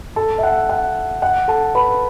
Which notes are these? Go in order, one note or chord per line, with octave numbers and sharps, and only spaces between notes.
A4 A5
E5
F#5
F#5
F#5
A4 A5
B4 B5